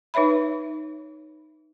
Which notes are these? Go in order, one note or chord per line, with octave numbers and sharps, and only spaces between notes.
D#4 B4 C#5 E5 B5